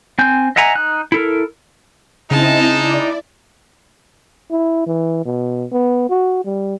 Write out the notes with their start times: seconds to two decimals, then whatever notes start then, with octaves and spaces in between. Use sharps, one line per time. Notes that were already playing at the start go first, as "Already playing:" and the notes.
0.19 C4 G#5 G6
0.56 D#5 E5 F#5 G#5 A#5
0.75 D#4 F#6
1.12 E4 A4 A#4
2.31 C#3 G#3 C4 D#4 E4 D#5 A5
2.76 E4 D5
4.51 E4
4.86 E3
5.25 B2
5.72 B3
6.10 F#4
6.44 G3